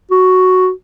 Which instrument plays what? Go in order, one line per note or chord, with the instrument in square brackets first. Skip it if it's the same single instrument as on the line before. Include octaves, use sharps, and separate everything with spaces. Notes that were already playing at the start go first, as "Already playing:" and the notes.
[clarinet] F#4